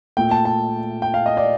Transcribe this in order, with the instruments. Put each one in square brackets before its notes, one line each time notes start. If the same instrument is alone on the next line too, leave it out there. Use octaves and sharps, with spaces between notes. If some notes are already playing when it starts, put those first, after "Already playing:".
[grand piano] A#2 A3 G5
A5
A5
G5
F5
D#5
D5